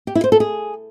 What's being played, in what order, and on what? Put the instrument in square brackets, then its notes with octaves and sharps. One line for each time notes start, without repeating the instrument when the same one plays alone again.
[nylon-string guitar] G4
E4
C5
A4
G#4